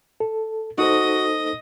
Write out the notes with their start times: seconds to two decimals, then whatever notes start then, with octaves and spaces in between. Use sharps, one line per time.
0.20 A4
0.78 D#4 F#4 A4 C5 D#5 D#6